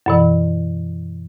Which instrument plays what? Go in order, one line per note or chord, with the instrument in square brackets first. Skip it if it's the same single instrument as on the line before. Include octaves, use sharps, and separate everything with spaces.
[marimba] F#2 B2 E3